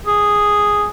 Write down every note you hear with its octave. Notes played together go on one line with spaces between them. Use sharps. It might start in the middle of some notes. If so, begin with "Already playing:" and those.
G#4